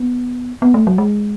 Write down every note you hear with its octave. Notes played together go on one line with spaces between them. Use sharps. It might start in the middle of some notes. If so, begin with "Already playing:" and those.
Already playing: B3
B3
A3
F#3
G#3